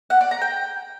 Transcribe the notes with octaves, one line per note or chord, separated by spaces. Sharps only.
F#5
D5
A#5
G5